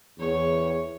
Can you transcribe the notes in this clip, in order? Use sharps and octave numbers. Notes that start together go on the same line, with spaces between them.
E2 C#5